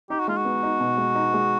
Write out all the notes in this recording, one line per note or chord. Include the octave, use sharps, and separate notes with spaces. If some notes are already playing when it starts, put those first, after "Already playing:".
D#4 G4
F#4
G#3 F4
F#4
B3
D#4
B2
G#3
D#4
G#3